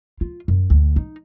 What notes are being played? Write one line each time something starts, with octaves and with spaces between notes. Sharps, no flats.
F4
F#2
D2
D#4